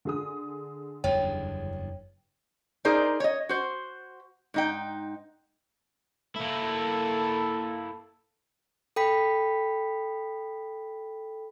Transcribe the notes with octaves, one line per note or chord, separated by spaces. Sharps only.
D3 G#4 D#6
F#1 E2 G2 C#5 G5
D#4 G#4 A#4 C5 D5
C#5 D#5
F#4 C5
G#2 D#4 G5
A#3 E4 A4
A4 G5 B5 B6